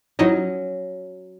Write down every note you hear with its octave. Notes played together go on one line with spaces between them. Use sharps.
F#3 C#4 D#4 E4 D#5